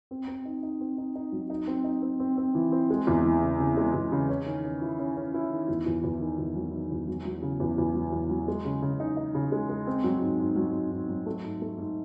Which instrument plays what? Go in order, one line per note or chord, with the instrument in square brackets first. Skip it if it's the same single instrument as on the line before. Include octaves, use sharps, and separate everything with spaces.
[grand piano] C4
C4
D#4
D#4
C4
D#4
D#4
F#3
D#4
C4
D#4
C4
C4
C4
E3
C4
G#3
E2
E3
C#3
C#3
G#3
E2
C#3
C#4
D#3
C#4
E4
C#4
C#4
E4
D#3
E2
E2
E2
D#3
E2
F#3
D#3
E2
F#3
F#3
C#3
E2
E2
F#3
E2
F#3
G#3
C#3
C#3
D#4
D#4
C#3
G#3
G#3
C4
F#3
G#2
G#2
F#3
G#2
G#2
F#3
A3
G#2
A3
G#2